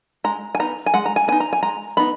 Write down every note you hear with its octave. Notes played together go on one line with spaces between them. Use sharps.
G#3 A#5
G#5
B3 D#4 A#5
G#5
G#3 F#5
A#5
G#5
B3 D#4 G#5
A#5
G#5
G#3 A#5
B3 D#4 B5